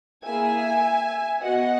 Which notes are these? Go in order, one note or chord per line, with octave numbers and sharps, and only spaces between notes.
A#3 E4 G#4 E5 G#5
B3 F#4 D#5 F#5